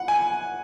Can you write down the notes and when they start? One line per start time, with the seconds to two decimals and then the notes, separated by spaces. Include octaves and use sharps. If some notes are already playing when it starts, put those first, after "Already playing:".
Already playing: F#5
0.08 G#5